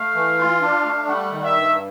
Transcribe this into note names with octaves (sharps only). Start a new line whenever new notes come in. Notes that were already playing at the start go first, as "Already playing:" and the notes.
Already playing: A3 F5
E3
F4
D4
A3
G3 F#5
D#3
E5
G2